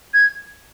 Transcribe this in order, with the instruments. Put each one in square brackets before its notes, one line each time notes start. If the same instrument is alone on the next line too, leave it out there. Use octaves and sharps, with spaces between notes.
[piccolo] G#6